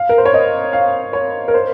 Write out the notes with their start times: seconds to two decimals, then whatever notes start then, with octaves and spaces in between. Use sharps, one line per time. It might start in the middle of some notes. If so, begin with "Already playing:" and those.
Already playing: F5
0.09 A#4
0.18 C5
0.26 C#5
0.34 D#5
0.73 F5
1.13 C#5
1.48 A#4
1.54 C5